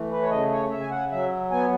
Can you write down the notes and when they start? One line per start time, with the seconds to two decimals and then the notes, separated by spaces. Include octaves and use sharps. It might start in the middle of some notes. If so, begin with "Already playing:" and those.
Already playing: E3 A3
0.11 B4
0.22 C#5
0.30 C#3 D#5
0.51 C#5
0.71 C#3 E5
0.80 G#5
0.91 F#5
1.11 F#3 E5
1.51 B3 G#5